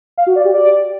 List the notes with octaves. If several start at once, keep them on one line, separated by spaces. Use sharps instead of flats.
F5
F#4
D5
G4
D5